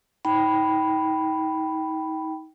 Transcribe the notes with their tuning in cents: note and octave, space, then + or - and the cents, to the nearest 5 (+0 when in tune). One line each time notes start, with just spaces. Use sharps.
D#4 +35 G5 -10 B5 +0